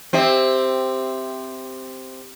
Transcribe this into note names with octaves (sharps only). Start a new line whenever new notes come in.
C4 G4 E5